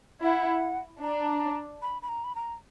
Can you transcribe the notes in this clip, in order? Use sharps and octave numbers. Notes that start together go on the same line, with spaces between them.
E4 F#5
D4 A#5
B5
B5
A#5
B5
A#5